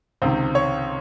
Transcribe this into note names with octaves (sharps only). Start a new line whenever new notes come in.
C#2 C3 D#3 C5
C#5